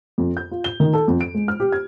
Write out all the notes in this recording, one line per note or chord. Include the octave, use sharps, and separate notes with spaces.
F2
G6
F4
G7
D#3
A4
F2
D7
G#3
F6
G4
G#6